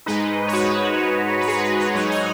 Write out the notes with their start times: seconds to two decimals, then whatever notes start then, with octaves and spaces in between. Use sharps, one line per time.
0.06 G#2 G#3 D#4 B4 D#5
0.48 C#5
0.53 F#4 B4
1.41 B4
1.47 G#4 C#5
1.63 G#4 C#5
1.79 B4 D#5
1.94 G#2 F#3 D#4 C#5 F#5
2.10 D#5 G#5